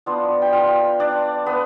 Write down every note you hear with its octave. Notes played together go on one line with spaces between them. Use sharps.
F3 B3 D4 F4
G5
F4 F5
D4 D5
B3 B4